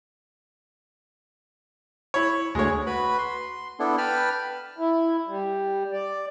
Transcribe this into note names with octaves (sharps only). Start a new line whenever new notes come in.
E4 C#5
D2 G#3 C#5
F#4 B4 B5
C6
B3 D4 E4 A4
B4 G5 A5 B5 F6
E4
G3
D5